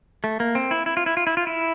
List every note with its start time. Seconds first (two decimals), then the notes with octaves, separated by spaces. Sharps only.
0.24 A3
0.40 A#3
0.55 C4
0.71 E4
0.86 E4
0.97 F4
1.06 E4
1.17 F4
1.27 E4
1.37 F4
1.47 E4